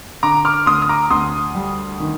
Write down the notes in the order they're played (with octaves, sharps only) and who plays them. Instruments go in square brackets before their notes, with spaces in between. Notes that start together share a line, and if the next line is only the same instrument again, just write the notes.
[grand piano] D3 A#5 D6
D6 F6
D2 C6 D#6
D#6
A#5 D6
D2 C6 D#6
G3
D#3